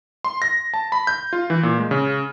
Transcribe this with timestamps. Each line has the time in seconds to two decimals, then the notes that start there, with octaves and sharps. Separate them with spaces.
0.24 C6
0.42 A#6
0.74 A5
0.92 B5
1.07 G6
1.33 F4
1.50 E3
1.63 A#2
1.78 G#3
1.91 C#3